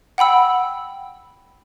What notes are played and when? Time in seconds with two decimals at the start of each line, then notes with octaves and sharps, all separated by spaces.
0.18 F#5 G5 B5 E6